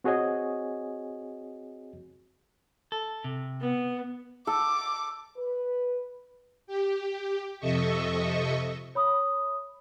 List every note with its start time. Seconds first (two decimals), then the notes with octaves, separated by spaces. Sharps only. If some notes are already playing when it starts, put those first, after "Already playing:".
0.04 C4 F#4 G#4 C#5 D#5 G#5
2.92 A4
3.24 C3
3.60 B3
4.47 A4 D6
5.37 B4
6.67 G4
7.60 F2 C3 A4 D#5 E5 C#6
8.95 C#5 B5 D#6